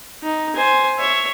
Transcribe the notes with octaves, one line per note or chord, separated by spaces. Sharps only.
D#4
C5 G#5
C#5 E5